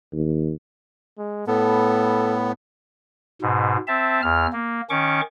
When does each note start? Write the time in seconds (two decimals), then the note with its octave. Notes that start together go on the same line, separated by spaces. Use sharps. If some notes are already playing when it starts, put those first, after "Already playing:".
0.12 D#2
1.18 G#3
1.47 A2 B3 A4
3.42 G#2 B2
3.88 C4 E5 A5
4.22 E2 F6
4.53 A#3
4.90 D#3 C#4 C#6 D6